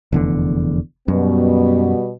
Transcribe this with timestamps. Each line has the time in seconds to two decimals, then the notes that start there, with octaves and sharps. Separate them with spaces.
0.12 F1 E2 D3
1.08 F#2 B2 G3 B3